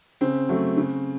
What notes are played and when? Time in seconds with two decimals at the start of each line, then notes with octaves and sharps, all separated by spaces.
0.21 C#3 C4
0.49 F#3 A3
0.77 C#3